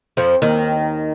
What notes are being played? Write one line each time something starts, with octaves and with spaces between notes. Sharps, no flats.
F2 F3
D#2 D#3